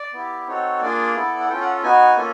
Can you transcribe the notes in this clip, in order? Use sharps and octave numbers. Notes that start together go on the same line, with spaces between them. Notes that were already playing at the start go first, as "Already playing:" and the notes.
Already playing: D5
B3 E4 G4
C4 D#4 F#4 A4 C#5
A#3 D4 F4 G#4 D5
B3 E4 A4
F#5
C#4 F4 A4 G5
F#5
B3 D#4 F#4 G#5
A#3 C#4 F4 A4